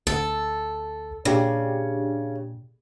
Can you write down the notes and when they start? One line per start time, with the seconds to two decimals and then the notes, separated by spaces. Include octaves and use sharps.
0.07 D2 A4
1.25 A#2 C#3 D4 G4